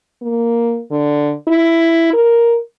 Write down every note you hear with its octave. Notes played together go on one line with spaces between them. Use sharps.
A#3
D3
E4
A#4